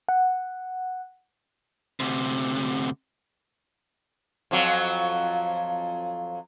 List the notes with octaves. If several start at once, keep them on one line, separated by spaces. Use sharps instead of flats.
F#5
D2 C3
F2 F3 F#3